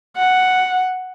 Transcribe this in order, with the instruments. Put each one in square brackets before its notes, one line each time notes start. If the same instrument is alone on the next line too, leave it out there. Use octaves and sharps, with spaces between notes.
[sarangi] F#5